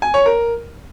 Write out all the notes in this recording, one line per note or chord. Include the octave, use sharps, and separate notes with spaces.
G#5
C#5
A#4